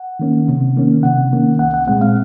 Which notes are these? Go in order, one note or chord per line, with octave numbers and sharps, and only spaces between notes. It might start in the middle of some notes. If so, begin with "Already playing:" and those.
Already playing: F#5
D#3 A#3 C#4
C3
D#3 A#3 C#4
C3 F#5
D#3 A#3 C#4
C2 F#5
F#5
A#2 G#3 C4 F#5
F5